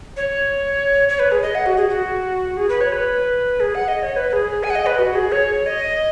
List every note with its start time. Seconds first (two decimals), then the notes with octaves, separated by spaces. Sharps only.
0.17 C#5
1.09 C#5
1.19 B4
1.32 G#4
1.42 D#5
1.55 F#5
1.66 F#4
1.77 G#4
1.89 F#4
2.57 G#4
2.69 B4
2.81 C#5
2.92 B4
3.60 G#4
3.75 F#5
3.88 D#5
4.03 C#5
4.16 B4
4.30 B4
4.33 G#4
4.64 G#5
4.70 F#5
4.75 D#5
4.86 B4
4.99 F#4
5.15 G#4
5.32 C#5
5.66 D#5